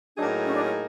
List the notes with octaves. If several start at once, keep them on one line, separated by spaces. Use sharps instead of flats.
A2 F#3 A#3 D4 D#4 G#4
C#4
D4
C#4